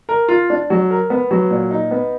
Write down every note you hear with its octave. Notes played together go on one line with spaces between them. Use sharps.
A#4
F4
D4
F#3
A#4
B3
F#3
A#2
D#4
B3